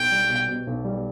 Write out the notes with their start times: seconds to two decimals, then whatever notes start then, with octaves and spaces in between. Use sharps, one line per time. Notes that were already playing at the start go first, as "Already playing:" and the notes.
Already playing: B1 G5
0.12 G3
0.29 B2
0.48 B2
0.67 B1
0.85 G3